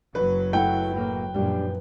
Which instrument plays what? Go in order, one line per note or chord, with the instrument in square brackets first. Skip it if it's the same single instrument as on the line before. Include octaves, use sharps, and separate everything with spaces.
[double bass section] F#1 F#3 [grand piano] B4
[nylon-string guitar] A3 E4 F#5 [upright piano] G5
[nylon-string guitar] A2 A#3
[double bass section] F#2 A#2 F3 [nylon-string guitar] G3 D4